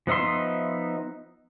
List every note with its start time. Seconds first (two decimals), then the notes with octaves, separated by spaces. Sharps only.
0.07 F3 B3 D#4 E5 C6